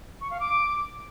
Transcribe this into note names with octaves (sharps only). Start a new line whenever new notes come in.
C#6
F5
D6